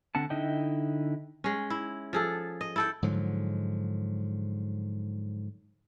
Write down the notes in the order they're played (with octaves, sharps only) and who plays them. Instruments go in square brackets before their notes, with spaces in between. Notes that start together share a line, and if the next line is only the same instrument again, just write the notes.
[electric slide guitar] D3 C4 F#5 A5
D3 D#4 E4 D#5 G5
[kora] G#3 C#4
E4
F3 G#4 A4
D#5
E4 A4 G5
[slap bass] G#2 D3 F3 F#3